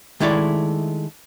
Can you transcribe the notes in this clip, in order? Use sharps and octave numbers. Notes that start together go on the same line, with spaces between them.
D#3 G#3 A3 E4 C#5 D5